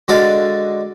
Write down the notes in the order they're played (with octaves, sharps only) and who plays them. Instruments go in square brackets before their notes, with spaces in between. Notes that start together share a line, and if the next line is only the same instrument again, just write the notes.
[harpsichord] D3 G#3 F#4 A4 D5 F5